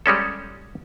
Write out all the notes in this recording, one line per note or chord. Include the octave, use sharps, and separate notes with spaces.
G3 G#3 C#4 A4